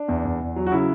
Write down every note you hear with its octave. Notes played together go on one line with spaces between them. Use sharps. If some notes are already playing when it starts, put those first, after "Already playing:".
Already playing: D4
E2
E2
E2
F#3
F#4
C#3 E4